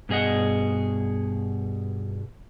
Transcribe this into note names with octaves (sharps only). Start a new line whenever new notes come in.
G2 B2 G#4 D#5 F#5